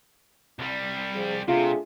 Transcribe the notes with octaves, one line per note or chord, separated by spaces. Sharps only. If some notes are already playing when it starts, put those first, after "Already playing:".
C2 G3
F3 G#4
C3 A3 D4 F4 G#4